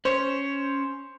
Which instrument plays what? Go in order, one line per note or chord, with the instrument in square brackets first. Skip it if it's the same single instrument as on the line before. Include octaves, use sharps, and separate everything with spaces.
[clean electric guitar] C#4 C#5 [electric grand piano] C5